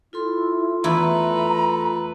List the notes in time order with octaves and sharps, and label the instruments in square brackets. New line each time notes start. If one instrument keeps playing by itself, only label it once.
[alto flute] E4 [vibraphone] F4 A4 C6
[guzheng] E2 E4 [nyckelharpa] A3 B4 [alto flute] A#5